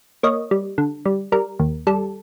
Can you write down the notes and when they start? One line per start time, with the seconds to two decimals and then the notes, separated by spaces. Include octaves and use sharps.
0.23 A#3 C#5 D#5
0.51 G3
0.78 D3
1.06 G3
1.32 G3 A#4
1.59 D#2
1.87 G3 A4